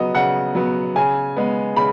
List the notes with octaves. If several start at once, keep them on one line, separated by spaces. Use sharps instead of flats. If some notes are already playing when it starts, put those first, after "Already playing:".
Already playing: C#3 F#3 B3 D#5
C#3 F#5
F#3 B3
C#3 G#5
G#3 B3
C#3 B5